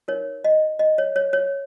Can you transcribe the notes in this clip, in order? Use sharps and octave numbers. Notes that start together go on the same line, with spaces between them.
D#4 A#4 C#5
D#5
D#5
C#5
C#5
C#5